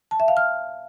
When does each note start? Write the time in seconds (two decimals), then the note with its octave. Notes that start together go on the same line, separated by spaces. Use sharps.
0.11 A5
0.20 E5
0.28 F5
0.37 F6